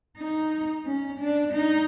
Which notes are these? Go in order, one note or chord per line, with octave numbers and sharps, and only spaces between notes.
D#4
C#4
D4
D#4